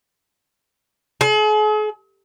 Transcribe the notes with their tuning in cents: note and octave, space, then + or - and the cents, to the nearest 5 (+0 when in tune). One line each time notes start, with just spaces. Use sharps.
G#4 +45